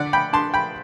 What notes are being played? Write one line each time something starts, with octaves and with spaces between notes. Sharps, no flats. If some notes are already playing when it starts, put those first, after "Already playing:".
Already playing: D3 D5 F#5
G5 B5
D4 A5 C6
G5 B5